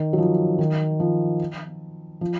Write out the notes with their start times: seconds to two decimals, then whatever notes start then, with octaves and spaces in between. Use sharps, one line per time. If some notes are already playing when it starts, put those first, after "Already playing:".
Already playing: D#3
0.13 F#3
0.18 F3
0.59 D#3
1.00 F3
2.21 F3